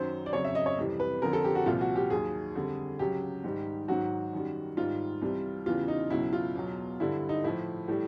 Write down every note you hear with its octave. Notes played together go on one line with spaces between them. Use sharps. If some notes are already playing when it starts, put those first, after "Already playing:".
Already playing: F#2 D#3 F#3 C5
D5
F2 C#3 F#3 C#5
E5
D#5
C#5
F2 C3 E3 G3
B4
F2 D3 F3 A#4
A4
G4
F#4
C2 A#2 F3 F4
F#4
G4
D#2 D#3 F#3 G#4
F2 D3 G3
C#2 C#3 F#3 G4
G#2 D#3 G3
G#2 D#3 F#3 F#4
F#2 D#3 G3
G#2 D#3 G3 F4
C2 C3 E3 G3
E2 C#3 E3 G3 F4
D#4
C#2 B2 F#3 E4
F4
E2 B2 F#3
G2 D3 G3 E4
D#4
A2 F3 E4
A2 E3 G3